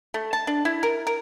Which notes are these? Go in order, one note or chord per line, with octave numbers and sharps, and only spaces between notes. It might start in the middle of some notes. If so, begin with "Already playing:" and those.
A3
A5
D4
E4
A#4
A#4